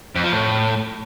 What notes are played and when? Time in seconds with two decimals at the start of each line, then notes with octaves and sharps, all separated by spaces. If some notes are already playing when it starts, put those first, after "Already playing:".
0.15 F2
0.24 F3
0.32 A2